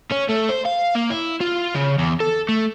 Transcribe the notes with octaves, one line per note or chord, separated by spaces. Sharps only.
C#4
A3
C5
F5
A#3
E4
F4
C#3
E2
A4
A3